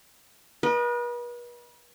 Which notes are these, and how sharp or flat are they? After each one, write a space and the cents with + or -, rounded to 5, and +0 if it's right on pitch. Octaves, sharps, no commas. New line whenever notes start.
B4 -40 D#5 -20